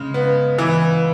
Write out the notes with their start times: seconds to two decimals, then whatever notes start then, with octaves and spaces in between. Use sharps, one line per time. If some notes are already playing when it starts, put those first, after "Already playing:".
Already playing: C#3 G#3
0.14 B3
0.59 E3